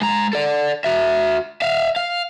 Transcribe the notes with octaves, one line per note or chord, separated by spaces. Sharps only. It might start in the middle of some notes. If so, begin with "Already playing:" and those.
G#3 A#5
A4 D5
F#4 E5
E5 F5
F5